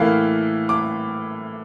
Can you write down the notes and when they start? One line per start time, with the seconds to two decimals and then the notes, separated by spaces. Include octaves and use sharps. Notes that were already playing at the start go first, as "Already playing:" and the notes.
Already playing: A2 E3 A#3 F5
0.69 D6